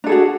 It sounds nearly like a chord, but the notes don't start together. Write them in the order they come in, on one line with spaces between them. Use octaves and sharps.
D4 A4 G#4 F#4